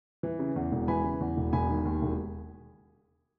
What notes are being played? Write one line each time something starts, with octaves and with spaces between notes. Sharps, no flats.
E3
C#3
E2
E1
E3 G#5 B5
C#3
E2
E1
E1 G#5 B5
D#3
D#2
E1